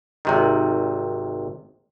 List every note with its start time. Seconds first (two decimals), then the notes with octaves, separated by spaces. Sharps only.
0.25 G#1 C3 D#3